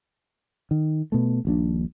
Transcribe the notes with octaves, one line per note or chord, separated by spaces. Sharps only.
D#3
B2 A3
D#1 A#1 D4